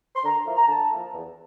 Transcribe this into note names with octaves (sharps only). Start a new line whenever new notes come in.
C6
D3 A#5
F3 A#3 E4
A#5
D3 A5
F3 A#3 E4
E2